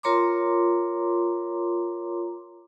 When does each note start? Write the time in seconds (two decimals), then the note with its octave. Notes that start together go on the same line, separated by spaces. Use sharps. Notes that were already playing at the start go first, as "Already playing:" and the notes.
0.03 F4 A#4 C#5 A#5 C6 D6